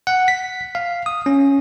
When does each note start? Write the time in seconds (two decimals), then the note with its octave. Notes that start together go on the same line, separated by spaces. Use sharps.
0.07 F#5
0.28 B6
0.75 F5
1.06 D#6
1.26 C#4